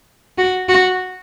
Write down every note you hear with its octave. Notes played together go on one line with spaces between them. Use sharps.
F#4
F#4